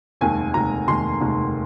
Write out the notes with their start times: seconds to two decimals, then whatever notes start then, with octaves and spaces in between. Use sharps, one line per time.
0.21 F1 D#2 D#3 G#3 G#5
0.54 F1 D#2 D#3 G#3 A#5
0.88 F1 D#2 D#3 G#3 C6
1.21 F1 D#2 D#3 G#3